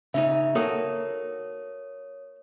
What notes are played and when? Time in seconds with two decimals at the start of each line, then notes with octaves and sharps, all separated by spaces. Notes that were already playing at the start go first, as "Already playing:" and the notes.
0.14 C#3 C#4 D#4 E5
0.55 A#3 F#4 A4 C#5 D#6